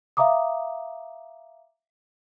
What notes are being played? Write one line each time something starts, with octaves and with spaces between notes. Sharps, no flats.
E5 F5 A#5 D6 D#6